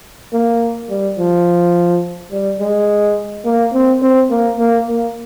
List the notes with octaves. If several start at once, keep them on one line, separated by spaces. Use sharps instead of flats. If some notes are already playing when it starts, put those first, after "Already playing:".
A#3
G3
F3
G3
G#3
A#3
C4
C4
A#3
A#3
A#3